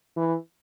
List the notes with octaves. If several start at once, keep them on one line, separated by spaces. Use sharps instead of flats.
E3